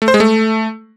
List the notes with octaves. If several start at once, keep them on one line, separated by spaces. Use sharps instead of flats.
A3
C5
G#3
A3